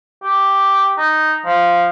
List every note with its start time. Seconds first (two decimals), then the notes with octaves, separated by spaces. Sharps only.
0.24 G4
0.97 D#4
1.46 F3